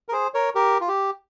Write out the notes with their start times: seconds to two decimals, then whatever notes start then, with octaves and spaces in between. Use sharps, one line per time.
0.09 A#4
0.12 G#4 C5
0.34 A#4 C#5
0.55 G4 A#4
0.81 F4
0.88 G4